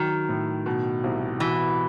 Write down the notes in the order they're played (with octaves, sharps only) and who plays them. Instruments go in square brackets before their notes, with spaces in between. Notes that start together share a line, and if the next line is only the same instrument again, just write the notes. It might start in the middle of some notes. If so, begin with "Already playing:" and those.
Already playing: [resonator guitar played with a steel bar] D#3 [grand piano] F#3
[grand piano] A2
B2
C2
[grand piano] B2 [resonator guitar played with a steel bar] E3